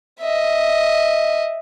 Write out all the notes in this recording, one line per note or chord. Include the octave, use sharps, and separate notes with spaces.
D#5 E5